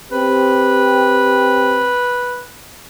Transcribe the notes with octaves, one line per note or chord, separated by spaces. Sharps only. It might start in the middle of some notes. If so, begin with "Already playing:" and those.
C4 G4 B4